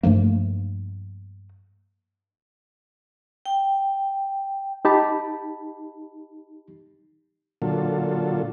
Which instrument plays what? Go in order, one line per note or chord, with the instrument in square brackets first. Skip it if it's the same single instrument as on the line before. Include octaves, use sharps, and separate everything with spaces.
[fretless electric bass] G2 F3 A3 A#3
[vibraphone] G5
[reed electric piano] D#4 G4 A5 B5
[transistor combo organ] A#2 D3 F#3 F4 A4